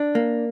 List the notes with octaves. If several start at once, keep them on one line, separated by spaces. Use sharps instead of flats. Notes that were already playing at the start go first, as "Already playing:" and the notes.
Already playing: D4
A#3